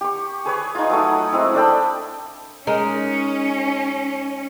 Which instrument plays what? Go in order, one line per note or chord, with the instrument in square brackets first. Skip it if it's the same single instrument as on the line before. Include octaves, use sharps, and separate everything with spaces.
[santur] G4 C#6
G#4 B4 C#5
D#4 F4
F#3 A3 D#6
G#3 C4 E4
D4 A4 G5 B5
[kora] G#3 D#4 A#4 [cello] C#4